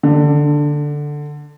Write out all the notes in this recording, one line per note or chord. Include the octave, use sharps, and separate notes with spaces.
D3